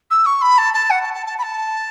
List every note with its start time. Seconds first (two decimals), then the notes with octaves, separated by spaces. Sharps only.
0.10 E6
0.26 C#6
0.41 B5
0.58 A5
0.74 A5
0.90 F#5
1.02 A5
1.13 A5
1.26 A5
1.38 B5
1.43 A5